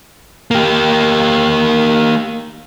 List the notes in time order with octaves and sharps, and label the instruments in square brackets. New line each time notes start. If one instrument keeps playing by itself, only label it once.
[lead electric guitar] A#3 G4